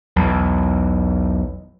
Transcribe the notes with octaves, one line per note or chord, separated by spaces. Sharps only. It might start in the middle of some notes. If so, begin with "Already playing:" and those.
B1 E2